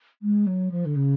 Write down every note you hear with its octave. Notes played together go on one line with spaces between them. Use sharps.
G#3
F#3
F3
D3
C#3